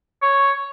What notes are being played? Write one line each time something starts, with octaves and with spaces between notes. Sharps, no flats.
C#5